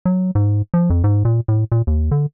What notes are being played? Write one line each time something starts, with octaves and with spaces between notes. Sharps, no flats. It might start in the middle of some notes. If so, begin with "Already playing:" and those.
F#3
G#2
F3
F2
G#2
A#2
A2
A#2
D#2
D3